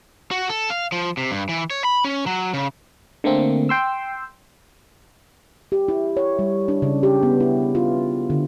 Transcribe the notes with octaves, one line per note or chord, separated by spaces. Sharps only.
F#4
A4
F5
F3
C3
G2
E3
C#5
B5
C#4
F#3
C#3
D3 A3 A#3 C4
G5 C6 E6
G4
E4
C#5
G3
D4
C#3
G4
B3
E4
F4
D3